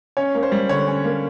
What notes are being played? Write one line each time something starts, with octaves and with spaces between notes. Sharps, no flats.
C#4 C#5
A#3
C5
G3
D3 C#5
C#4
A#3